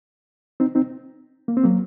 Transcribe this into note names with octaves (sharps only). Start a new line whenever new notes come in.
C4 D#4
C4 D#4
A#3
C4
F#3 A#3